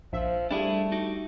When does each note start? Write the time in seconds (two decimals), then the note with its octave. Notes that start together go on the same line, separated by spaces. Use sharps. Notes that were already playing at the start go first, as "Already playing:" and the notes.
0.13 A#1 F3 E5
0.51 G3 A3 D4 E4 G#4
0.92 D#4 F#4 G4